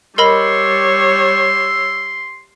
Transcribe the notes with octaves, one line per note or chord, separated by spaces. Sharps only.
G3 A#4 C#5 D#5 B5 C6 E6